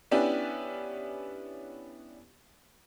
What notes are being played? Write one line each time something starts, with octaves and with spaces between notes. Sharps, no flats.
B3 C#4 D4 E4 G4